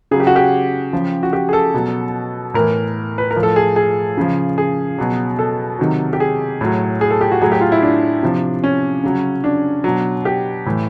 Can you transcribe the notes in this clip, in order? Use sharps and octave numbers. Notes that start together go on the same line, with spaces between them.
C#3 F#3 G#4
G4
F#4
G4
C#3 F3
F#4
G4
G#4
A4
B2 F#3
A2 E3 A#4
B4
A#4
A2 F3
A4
G#4
G#4
C#3 F3
G#4
B2 F#3
A4
C3 D#3 F#3
G4
G#4
A2 F#3
G#4
A4
G4
F#4
A2 F#3 G#4
G4
F4
E4
D4
C3 F3
C#4
C#3 F#3
D4
B2 F#3
G4
A2 E3